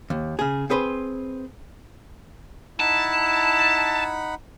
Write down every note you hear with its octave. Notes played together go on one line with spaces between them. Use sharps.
D#2
C#3 G#4
C4 G#4 B4 C5
D#4 E4 F#5 A5 B5